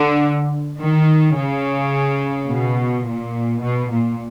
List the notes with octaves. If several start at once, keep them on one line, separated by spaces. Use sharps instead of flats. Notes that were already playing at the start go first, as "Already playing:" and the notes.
Already playing: D3
D#3
C#3
B2
A#2
B2
A#2